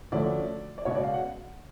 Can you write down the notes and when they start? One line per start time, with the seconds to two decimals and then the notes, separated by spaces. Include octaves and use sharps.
0.12 D2 D3 F3 A3 C#4 D5
0.78 D5
0.85 C#2 B2 G#3 C#4 C#5
0.95 D5
1.04 F5
1.13 F#5